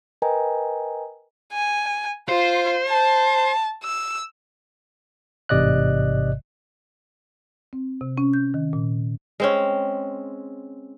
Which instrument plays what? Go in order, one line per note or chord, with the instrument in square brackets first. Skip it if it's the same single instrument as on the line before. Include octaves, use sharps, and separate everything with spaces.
[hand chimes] A#4 B4 D#5 G5 G#5 A#5
[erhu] G#5
[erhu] F4 [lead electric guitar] C5
[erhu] A5
E6
[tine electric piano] A1 G#2 C3 D5 D#5 F#6
[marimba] C4
C3
C#4
G6
D#3
A#2
[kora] G#3 C4 C#4